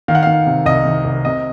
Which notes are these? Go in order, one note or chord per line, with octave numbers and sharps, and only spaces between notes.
D#3 F5
F#5
D#3 F5
C3
C2 D#5
D#3
C2
C3 D#5